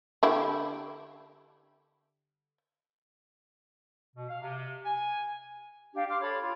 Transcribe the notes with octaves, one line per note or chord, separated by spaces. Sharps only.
D3 E4 G4
B2
F5
C3
G#5
D4 G4 F5
C6 D6 F6
A4 C#5 B5
F4